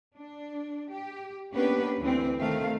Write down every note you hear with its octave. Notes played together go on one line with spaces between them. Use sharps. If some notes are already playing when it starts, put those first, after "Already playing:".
D4
G4
A#3 B3 C#4 D4 G4 B4
D2 E3 C4
C3 D#3 A3 C4 F5